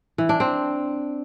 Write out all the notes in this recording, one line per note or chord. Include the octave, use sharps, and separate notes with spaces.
E3
D4
C4